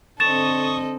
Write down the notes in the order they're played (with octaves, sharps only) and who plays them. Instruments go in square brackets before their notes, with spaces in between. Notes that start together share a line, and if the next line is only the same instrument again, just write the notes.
[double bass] D3 C4 [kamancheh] A4 D#5 [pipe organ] C#6 D#6 [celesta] A6 E7